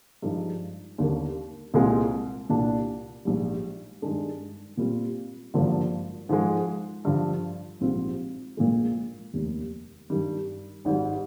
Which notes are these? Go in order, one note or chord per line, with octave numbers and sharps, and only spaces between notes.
G2 F3 G#3 D#4
D#2 D3 G3 A#3
C2 A#2 G#3 C4 F4
C2 A#2 G3 D4
A#1 G#2 G3
G2 D#3 G#3 D4
A#2 G3 C4 F4
G#1 G2 D3 F3 A#3
G#2 F3 G#3
G2 D3 F3
A#1 G#2 G3 C4 F4
A#1 A#2 F3 G#3
F1 D#2 D#3 G3
G2 D#3 G3
G#1 G#2 G3